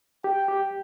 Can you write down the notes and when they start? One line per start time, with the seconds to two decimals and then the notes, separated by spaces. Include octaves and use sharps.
0.24 G4 G5
0.48 G4